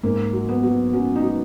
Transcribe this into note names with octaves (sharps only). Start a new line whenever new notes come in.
G#2 A#3
F#3
B3
F#3
F#3 C#4
D#4
F#3